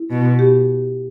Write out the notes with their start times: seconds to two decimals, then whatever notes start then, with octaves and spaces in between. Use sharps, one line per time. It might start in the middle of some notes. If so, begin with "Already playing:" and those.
Already playing: E4
0.10 B2
0.39 G4